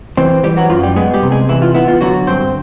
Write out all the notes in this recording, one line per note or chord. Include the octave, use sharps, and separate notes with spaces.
E3 C4 C5
E3 G3 G4
F#3 F#4
F#2 F4
G3 G4
G#3 B3 G#4
G3 G4
C3
G#3 G#4
E3 E4
F4
B3 E4
F4
D3 F#3 F#4
G2 C4 C5